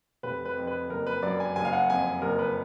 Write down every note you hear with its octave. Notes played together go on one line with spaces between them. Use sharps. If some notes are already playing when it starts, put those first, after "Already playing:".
F1 B4
B4
F2
B4
F#1 A#4
B4
F#2 D5
G#5
F#1 G#5
F5
F#5
F2 G#5
F#1 A#4
B4